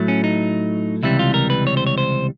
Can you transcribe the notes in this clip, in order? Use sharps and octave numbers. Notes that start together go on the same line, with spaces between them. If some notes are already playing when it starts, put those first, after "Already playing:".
Already playing: A2 F#3 A3
C#4
D#4
C#2 C3 E3 G3 E4
F4
A#4
B4
C#5
C5
C#5
C5